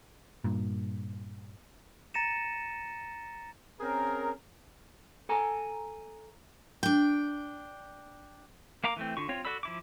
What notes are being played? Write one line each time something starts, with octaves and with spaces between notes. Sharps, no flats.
G2 A#2
A#5 A6 A#6 C#7 D#7 E7
C4 C#4 G#4 A#4
A4 G#5 A#5
D4 G5
A#3 F5 A#5 D6
E3 A3 C4
D3 F4 C#6
C4 F4 C#5
F#4 A4 D5 B5 E6
F3 E4 D6